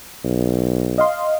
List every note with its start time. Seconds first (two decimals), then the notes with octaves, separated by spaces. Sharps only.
0.24 B1
0.98 D#5 F5 C6